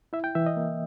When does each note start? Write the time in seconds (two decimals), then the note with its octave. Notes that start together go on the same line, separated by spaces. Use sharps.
0.13 E4 E5
0.24 G5
0.35 E3 E5
0.46 D#5
0.57 A#3